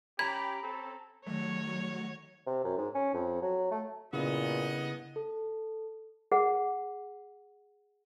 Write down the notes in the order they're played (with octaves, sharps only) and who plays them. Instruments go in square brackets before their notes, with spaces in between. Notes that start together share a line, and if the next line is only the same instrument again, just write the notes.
[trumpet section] C#4 G4 [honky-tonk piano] A#5 [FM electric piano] B5 [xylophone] G#6
[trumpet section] C4 C#4 A4
[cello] D#3 [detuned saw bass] F#3 [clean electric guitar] G3 A3 [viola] C#5
[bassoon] C3
F#2
G#2
C#4
F2
F#3
A3
[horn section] G2 B3 D#5 [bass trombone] A#2 [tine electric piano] C#3 E4
[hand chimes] A4
[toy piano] G#4 F#5